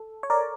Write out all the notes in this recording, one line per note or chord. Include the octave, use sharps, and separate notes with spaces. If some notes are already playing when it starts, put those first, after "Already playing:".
Already playing: A4
C#5
A#4 D5